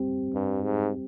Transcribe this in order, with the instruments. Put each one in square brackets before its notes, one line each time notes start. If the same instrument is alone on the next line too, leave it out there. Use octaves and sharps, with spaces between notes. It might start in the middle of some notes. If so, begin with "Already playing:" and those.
Already playing: [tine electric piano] G3 C4 G4
[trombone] G2
G#2